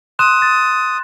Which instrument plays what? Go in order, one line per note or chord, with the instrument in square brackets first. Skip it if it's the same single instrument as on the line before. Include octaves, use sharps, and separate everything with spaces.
[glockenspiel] C6 F#6 E7 [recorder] D#6
[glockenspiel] A6